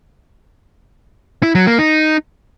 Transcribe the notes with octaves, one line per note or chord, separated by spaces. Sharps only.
E4
F#3
A#3
D#4